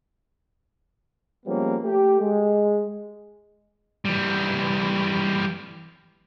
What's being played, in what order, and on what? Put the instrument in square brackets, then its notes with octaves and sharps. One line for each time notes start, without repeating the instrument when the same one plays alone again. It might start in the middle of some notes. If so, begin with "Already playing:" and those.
[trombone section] F3 G3 G#3 A#3 B3 C#4
A3 G4
G#3
[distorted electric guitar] E3 G3